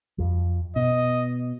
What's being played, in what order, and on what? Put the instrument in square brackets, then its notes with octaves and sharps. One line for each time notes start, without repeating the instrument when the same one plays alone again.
[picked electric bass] F2 F3
[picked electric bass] B2 [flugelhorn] D#5